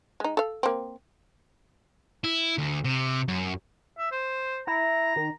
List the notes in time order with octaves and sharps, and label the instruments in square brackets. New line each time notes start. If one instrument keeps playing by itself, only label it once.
[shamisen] G#3 D#4
A4 F5
A#3 C4
[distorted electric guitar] E4
D2
C3
F#2
[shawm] E5
C5
[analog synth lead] E4 [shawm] A#5
[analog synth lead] D#3